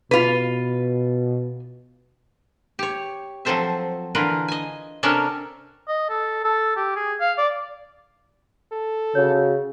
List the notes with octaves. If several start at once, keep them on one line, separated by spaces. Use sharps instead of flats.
B2 F4 B4
G4 C#5
F3 F#3 C4 A4 C5 E5
D3 E3 F4 A#4 B4
D#5 G#5
C3 C#4 D4 A4 A#4 E5
D#5
A4
A4
G4
G#4
F5
D5
A4
C#3 F#4 C#5